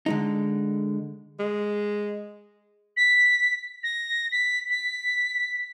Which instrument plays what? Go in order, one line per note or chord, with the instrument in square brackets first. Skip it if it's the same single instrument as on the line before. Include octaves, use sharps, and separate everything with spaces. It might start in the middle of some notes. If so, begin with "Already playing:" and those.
[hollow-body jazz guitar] D3 G#3 D#4
[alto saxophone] G#3
[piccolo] B6
A#6
B6
B6